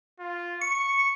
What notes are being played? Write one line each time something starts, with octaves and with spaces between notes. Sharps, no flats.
F4
C#6 C#7